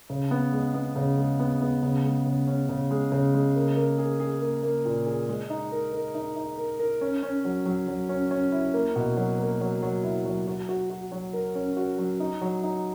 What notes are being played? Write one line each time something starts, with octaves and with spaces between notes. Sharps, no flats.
C#3
B3
G#3
B3
C#3
G#3
B3
B3
C#3
G#3
C#3
C#4
C#3
G#3
C#3
G#3
A#3
A#3
G#4
G#4
A#3
A#3
A#2
G#4
G#3
D#4
A#4
A#4
D#4
D#4
A#4
A#4
C#4
C#4
F#3
F#3
F#3
C#4
C#4
E4
A#3
B2
F#3
A#3
F#3
F#3
E4
F#3
F#4
F#4
F#4
F#3
A#4
C#4
F#4
F#3
D#4
F#3
D#4